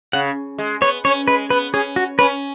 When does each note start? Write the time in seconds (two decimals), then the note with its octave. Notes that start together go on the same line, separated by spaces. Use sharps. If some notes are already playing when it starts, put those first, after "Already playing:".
0.13 C#3 F#5
0.58 G#3
0.81 B3 C#5
1.05 C#4 C#5
1.28 G#3 B4
1.50 B3 B4
1.74 C#4 G#4
1.96 F#4
2.19 C#4 B4